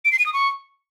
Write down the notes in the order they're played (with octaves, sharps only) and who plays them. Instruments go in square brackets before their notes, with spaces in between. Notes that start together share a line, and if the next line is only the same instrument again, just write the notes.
[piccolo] D7
C7
D#7
D#6
C#6